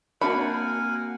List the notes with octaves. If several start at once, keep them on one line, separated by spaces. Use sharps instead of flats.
A#3 C4 D4 F#4 A#4 F#5 G#5 B5